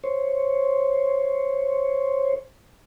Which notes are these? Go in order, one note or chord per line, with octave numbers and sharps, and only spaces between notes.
C5 C#5